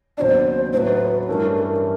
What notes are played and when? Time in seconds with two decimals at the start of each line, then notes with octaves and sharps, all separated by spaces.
0.17 D#2 C#3 F#3 B3 D4 C5 D5
0.73 A2 F#3 A3 B4 C5
1.28 G2 E3 A3 C#4 A#4
1.56 A#4